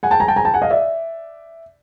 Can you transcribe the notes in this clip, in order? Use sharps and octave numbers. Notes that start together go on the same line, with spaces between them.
F#5 G#5
G5 A5
G#5 A#5
G5 A5
G#5 A#5
G5 A5
F#5 G#5
D#5 F5
D5 E5